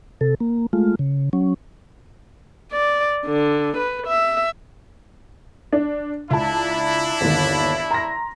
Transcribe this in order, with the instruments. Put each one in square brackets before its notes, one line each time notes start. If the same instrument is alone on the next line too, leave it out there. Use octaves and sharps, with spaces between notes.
[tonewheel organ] C3 A4
A#3
G#3 A3 F4
C#3
F#3 C#4
[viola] D5
D3
B4
E5
[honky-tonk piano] D4
[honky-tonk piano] C#2 A5 [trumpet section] D4 E4
[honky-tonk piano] G1 D#2
A#5 C6 A#6